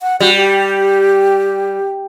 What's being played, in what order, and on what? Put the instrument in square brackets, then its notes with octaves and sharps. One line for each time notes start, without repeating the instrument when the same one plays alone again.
[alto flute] F#5
[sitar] G3 [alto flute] F#4
[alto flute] G4